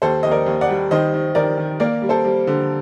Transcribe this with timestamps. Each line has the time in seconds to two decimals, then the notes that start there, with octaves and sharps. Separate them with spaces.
0.02 D#2 A4 C5
0.23 D#2 D#5
0.31 A#4 D5
0.46 D#2
0.61 D5 F#5
0.69 G3
0.91 D#3 C5 D#5
1.14 D#3
1.35 D#3 A#4 D5
1.57 D#3
1.80 A#3 A#4 D5
2.02 G3
2.09 A4 C5
2.24 G3
2.47 D3